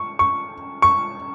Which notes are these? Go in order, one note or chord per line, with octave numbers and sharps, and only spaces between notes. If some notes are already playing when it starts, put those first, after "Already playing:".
Already playing: C#6
C#6
C#6